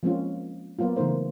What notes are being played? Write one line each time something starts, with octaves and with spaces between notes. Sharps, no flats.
F3 G#3 A#3 C4 C#4 F4
F#3 A#3 B3 F4
C#3 E3 A3 D#4 A#4 C5